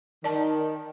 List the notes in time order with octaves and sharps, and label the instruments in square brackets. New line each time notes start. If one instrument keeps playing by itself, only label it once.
[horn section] D#3 [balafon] D5 A5